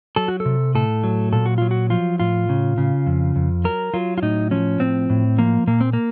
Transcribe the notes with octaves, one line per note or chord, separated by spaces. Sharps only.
F#3 A4
F#4
A4
C3
A2 A4
F#3
A#2 A4
F#4
F#3 F4
F#4
F3 F4
A2 F4
C#3
C#3
F2
F2
F#3 A#4
F#3 F4
F4
A2 D#4
F3 C#4
A2 C4
A2
F3 A#3
A#2 A#3
C4
A#3